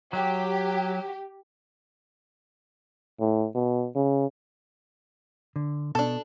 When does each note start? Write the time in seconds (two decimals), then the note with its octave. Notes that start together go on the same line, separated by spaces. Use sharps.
0.13 F#3 G4
3.20 A2
3.55 B2
3.95 C#3
5.56 D3
5.95 B2 D4 A4